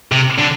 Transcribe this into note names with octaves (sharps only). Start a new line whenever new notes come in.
C3
D3